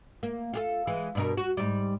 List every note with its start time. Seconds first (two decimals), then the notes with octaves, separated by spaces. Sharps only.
0.23 A#3
0.53 F4 G4 A4
0.87 E3 G#3
1.15 G2 B2 A#4
1.37 F#4
1.57 G#2 G3